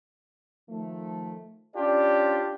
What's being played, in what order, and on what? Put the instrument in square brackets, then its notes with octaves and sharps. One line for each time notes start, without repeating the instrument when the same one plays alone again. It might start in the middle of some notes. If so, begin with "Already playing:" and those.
[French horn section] D#3 F3 A3
[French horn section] C#4 D5 [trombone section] D4 F4 G4